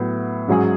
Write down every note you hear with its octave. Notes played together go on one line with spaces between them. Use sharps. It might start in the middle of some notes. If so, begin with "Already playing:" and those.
Already playing: A2 F#3 B3
G#2 F#3 C#4 G#4